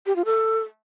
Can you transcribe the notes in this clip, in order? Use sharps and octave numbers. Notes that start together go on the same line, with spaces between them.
G4
F4
A4